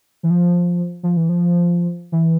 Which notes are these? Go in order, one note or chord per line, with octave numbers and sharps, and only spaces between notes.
E3
F3
F3
E3
F3
E3